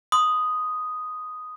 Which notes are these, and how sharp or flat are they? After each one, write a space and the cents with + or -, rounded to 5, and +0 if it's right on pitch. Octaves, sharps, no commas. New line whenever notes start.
C6 -30 D#6 +0